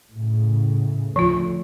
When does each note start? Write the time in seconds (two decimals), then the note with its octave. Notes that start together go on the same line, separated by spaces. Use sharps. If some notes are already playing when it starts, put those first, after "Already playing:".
0.12 A2 C#3
1.16 D2 F3 F4